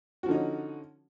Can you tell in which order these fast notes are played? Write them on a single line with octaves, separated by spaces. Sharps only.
F#4 F3 D3 D#4 C#4